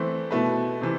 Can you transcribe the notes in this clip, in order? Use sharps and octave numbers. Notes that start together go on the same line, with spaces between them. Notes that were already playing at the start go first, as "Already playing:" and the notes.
Already playing: E3 A3 C4
B2 A3 E4 B4
C3 E3